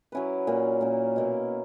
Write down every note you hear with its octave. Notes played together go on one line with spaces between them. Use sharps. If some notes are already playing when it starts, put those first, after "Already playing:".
F#3 C#4 E4 B4
A#2 A#3 C#4
A#2 A#3 C#4
B2 A#3 E4